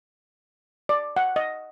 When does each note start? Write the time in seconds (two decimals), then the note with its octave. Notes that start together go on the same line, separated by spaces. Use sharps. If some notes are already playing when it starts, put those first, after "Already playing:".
0.89 D5
1.16 F#5
1.36 D#5